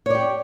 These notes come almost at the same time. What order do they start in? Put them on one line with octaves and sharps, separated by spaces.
C#5 D5 G4